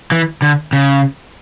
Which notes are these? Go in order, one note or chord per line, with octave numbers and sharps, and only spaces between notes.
E3
D3
C#3